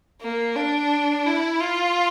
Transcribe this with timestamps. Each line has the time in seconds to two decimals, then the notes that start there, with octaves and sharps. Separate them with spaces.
0.21 A#3
0.56 D4
1.26 E4
1.60 F4